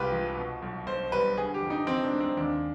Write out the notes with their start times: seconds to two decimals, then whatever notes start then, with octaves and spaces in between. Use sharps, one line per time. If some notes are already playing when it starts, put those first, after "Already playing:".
Already playing: C2 C3 G#3 F4 G4 B4
0.12 F3
0.37 B2
0.62 B1
0.87 B1 C5
1.12 G3 B4
1.37 D3 G#4
1.54 G4
1.62 F2
1.70 D#4
1.87 F2 C4
2.04 D4
2.12 G#3
2.20 C4
2.37 D#2 D4